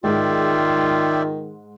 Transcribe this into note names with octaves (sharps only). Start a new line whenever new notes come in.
G#2 D#3 G#3 F4 D5 E5 G5